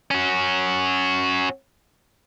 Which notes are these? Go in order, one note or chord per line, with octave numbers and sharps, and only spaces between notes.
C#4 F#4